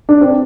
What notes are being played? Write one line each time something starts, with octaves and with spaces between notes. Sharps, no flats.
D4
C4